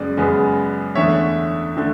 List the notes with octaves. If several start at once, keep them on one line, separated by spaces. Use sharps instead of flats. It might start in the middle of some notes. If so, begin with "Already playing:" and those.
Already playing: F#2 C#3 G#3 B3 D5
F#2 C#3 G#3 B3
E2 D3 A3 C#5 E5
D3 A3